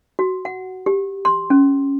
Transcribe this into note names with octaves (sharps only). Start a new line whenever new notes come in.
F#4
F#5
G4
C6
C#4